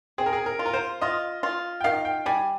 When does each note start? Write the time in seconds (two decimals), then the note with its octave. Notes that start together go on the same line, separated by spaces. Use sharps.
0.18 C4 G#4
0.26 A#4
0.33 G#4
0.46 A#4
0.59 F4
0.66 A#4
0.73 C5
1.01 F4 D#5
1.43 F4
1.81 G5
1.84 D#3 F5
2.05 G5
2.26 G3 G#5